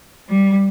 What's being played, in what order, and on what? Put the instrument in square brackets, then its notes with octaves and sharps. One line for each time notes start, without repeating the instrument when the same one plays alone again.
[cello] G3